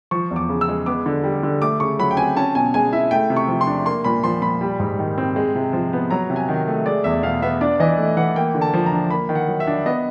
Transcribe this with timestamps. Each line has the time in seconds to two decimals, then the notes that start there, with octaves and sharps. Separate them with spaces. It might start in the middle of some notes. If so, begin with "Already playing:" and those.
0.11 F3 C#6
0.31 E2
0.36 D6
0.49 C#3
0.61 E6
0.68 G#3
0.86 B3 D6
1.06 D3
1.24 G3
1.43 D3
1.61 A3 D6
1.80 C#3 C#6
1.99 F#3 B5
2.11 G5
2.17 C4 G#5
2.36 C#4 A5
2.55 B2 G#5
2.74 G#3 G#5
2.93 E4 E5
3.11 A3 G5
3.30 C3
3.36 C#6
3.48 F3
3.61 C6
3.67 D4
3.86 A#3 C6
4.04 A#2 B5
4.24 F3 C6
4.42 A#2 B5
4.61 G3
4.80 G#2
4.99 D#3
5.18 C4
5.36 G#3
5.55 C3
5.73 F3
5.93 B3
6.10 F#3 A#5
6.30 C3
6.36 G#5
6.49 D#3
6.68 A3
6.86 G#3 D5
7.04 E2 E5
7.23 B2 F5
7.42 B3 E5
7.61 D4 D5
7.80 E3 D#5
7.98 A3
8.17 E3 F#5
8.36 A#3 G5
8.55 D3
8.61 A5
8.74 F3
8.86 A#5
8.92 D4
9.11 A#3 B5
9.29 D#3
9.35 F#5
9.48 F#3
9.60 E5
9.67 D4
9.86 B3 D#5